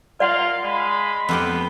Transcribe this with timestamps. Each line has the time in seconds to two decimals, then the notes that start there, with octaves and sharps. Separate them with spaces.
0.20 F4 A#4 D5 F5 F#5 C6
0.63 G#3 B5
1.29 F2 B3 G4 G5